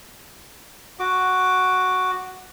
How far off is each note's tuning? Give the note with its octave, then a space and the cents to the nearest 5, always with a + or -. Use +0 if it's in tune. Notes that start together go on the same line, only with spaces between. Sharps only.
F#4 +0 D6 +5